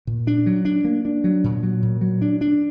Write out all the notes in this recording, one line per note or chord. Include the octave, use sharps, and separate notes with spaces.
A#2
D4
F#3
D4
A#3
D4
F#3
A#2
F#3
A#2
F#3
D4
D4